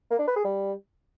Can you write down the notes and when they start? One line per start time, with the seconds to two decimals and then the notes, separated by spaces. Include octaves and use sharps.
0.10 A#3
0.19 D4
0.28 B4
0.36 G#4
0.45 G3